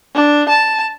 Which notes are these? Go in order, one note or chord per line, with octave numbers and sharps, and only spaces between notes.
D4
A5